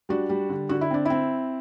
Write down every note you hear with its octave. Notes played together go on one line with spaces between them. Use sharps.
G3 D4 F#4
G3
D3
D3 F#4
E4
C4 D4
C4 E4